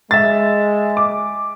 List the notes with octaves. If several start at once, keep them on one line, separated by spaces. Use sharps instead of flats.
G#3 E5 A6
D6